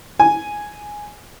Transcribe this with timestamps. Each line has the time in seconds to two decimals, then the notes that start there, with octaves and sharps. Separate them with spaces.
0.20 G#5